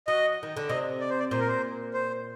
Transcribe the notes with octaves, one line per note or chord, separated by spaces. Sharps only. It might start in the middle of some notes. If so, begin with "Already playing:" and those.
F#3 D#5
D#3
D3
C3 D#5
D5
C5
D5
A#2 C5
A#4
C5
C5